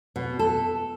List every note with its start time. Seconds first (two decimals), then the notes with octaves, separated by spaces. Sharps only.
0.16 B2
0.39 A4